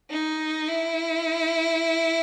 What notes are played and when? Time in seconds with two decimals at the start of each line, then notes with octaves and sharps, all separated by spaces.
0.10 D#4
0.68 E4